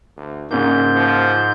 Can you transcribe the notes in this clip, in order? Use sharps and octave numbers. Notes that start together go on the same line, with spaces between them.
D2
A#1 G#2 C#3 A#3 G6
F3